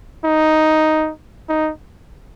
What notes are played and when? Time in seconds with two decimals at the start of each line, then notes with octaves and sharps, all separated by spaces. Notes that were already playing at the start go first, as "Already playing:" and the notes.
0.25 D#4
1.49 D#4